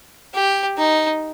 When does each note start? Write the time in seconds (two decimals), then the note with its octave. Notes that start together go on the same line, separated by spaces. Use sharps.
0.34 G4
0.78 D#4